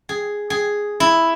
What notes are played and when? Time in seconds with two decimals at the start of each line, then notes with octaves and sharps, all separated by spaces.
0.09 G#4
0.50 G#4
1.00 E4